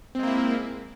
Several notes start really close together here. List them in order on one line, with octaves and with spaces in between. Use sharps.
C4 G#3 A#3 E4